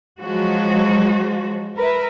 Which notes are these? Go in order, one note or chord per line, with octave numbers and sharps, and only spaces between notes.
F3 F#3 G#3 F#4
A#4 B4 E5